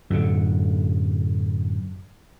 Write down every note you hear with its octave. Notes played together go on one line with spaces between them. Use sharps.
F#2 A2 D3